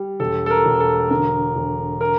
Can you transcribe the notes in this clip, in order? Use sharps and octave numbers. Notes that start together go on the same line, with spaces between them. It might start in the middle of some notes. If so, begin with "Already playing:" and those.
Already playing: G3
E1 A4
A4
A#4
E1
A4
D3 A#4
E1
A#4